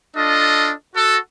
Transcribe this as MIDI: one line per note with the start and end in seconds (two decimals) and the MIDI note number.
0.16 0.71 62
0.16 0.71 65
0.16 0.71 69
0.16 0.71 75
0.94 1.16 66
0.94 1.16 69